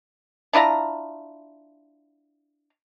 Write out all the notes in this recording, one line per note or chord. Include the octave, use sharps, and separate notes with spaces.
D4 E4 F4 A#5